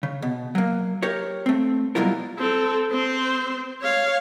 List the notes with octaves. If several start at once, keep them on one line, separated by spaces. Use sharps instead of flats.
C#3
B2
F#3 A#3
G4 A#4 C#5
A3 C4
B2 F#3 G3 E4 F4 A#4
C4 A4
C4 C5
C#5 F5